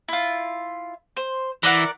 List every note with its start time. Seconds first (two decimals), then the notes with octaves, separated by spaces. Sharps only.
0.08 E4 F4
1.17 C5
1.63 E3 A#4 D5 F#5